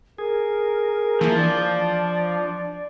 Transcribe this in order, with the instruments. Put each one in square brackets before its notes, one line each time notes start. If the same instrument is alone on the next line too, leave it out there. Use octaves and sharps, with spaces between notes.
[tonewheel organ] G#4 [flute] A#4
[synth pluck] E3 A#3 E4 [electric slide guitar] F3
[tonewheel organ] D4 [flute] D5